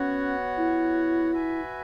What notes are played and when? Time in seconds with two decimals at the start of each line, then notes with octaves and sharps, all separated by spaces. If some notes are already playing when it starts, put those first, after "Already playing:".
Already playing: B3 C#4 F#4 C#5 F#5
0.57 E4
1.31 F#4 B4 E5 G#5